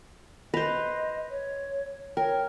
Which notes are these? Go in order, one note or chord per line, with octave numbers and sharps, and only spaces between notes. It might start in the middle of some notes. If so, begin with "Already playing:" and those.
B4 C5 D#5 A#6 F7
C#5
A#4 C#5 G5